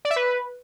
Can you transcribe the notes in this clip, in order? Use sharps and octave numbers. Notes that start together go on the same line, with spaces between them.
D5
E5
B4